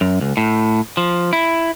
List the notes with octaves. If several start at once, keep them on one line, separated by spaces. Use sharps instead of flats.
F#2
C#2
A2
F3
E4